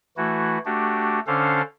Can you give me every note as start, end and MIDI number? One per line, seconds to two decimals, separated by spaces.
0.17 0.58 52
0.17 0.58 57
0.17 0.58 64
0.17 0.58 66
0.65 1.20 57
0.65 1.20 62
0.65 1.20 66
0.65 1.20 67
1.27 1.62 50
1.27 1.62 61
1.27 1.62 62
1.27 1.62 69
1.27 1.62 72
1.27 1.62 77